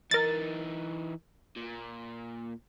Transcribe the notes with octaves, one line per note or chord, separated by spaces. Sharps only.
E3 D#4 A#4 A6
A#2